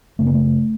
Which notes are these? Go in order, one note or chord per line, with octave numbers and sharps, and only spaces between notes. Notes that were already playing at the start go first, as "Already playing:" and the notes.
F#1 F#2 C#3 A3
A#3
A3